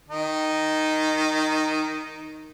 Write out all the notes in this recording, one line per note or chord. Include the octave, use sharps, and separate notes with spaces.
D#3 D#4